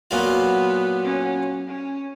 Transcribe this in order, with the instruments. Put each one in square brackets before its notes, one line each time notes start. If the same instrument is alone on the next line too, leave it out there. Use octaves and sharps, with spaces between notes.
[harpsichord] A#2 F#3 A#3 F4 [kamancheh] B3
[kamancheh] C#4
C#4